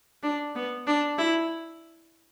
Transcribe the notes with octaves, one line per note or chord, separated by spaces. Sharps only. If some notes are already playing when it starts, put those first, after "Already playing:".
D4
B3
D4
E4